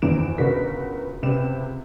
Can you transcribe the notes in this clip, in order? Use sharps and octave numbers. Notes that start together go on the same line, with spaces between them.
G#1 E2 E3 D7 E7
G1 C#2 B3 F#4 A#4 B6
C#2 C3 B3 G4 E7